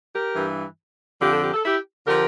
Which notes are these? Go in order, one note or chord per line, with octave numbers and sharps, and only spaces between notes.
G4 A#4
G2 E3
F2 D3 F3 G4
A4
G4
A4
E4 G4
D3 F3 G4 A#4